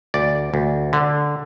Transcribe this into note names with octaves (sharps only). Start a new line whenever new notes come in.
D2 D5
D2
D3